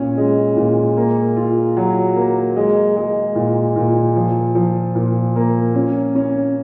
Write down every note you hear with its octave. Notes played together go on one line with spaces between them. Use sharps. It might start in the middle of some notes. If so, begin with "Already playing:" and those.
Already playing: A#2 C#4
G#3
A#2
A#3
F4
F#3
A#3
G#3
G#3
A#2
A#2
F3
F3
A#2
A#3
C#4
C#4